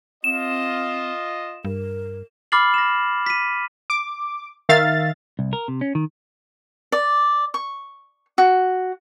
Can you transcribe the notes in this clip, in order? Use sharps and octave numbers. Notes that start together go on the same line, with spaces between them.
C4 F4 D#5 E7
G2 A#4
B5 D6 F6 A6 C7 F#7
A#6 E7
B6 D#7
D6
D#3 E5 F5 A6
C2
A#4
C3
C#4
D#3
D5
C#6
F#4